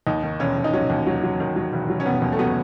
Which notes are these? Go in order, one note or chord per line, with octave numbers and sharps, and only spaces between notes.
D#2 D#4
D#3
E1 C#4
E1
D#4
F#3 C#4
D#2
F#3
F#3
D#3
F#3
E1
F#3
C#4
E1 B3
D#2
A3
F#3 B3